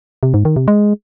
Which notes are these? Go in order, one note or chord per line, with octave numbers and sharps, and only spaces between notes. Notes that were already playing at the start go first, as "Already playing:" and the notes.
C3
G#2
D#3
C3
G#3